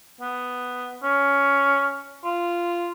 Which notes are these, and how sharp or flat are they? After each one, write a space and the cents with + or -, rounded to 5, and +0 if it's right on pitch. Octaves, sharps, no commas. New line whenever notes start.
B3 +5
C#4 +10
F4 -10